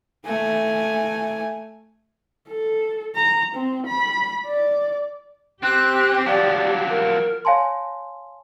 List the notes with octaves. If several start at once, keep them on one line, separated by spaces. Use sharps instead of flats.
A3 G#5
A4
A#5
C4
B5
D5
C4 G4 F#6
F3 F#3 D5
A#4
C#5 F5 G#5 A5 C6